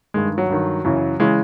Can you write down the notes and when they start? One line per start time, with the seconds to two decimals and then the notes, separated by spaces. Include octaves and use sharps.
0.14 G2 D#3 G#3
0.38 F#3
0.49 G2 D#3
0.85 F#2 C#3 E3
1.20 C#3 E3 G#3